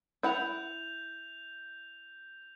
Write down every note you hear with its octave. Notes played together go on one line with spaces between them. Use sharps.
E4 F#5 G6 F7